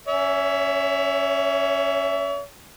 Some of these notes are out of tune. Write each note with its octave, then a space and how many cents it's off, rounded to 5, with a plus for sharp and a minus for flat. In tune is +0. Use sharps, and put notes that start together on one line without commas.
C#4 +0 C#5 +40 E5 +10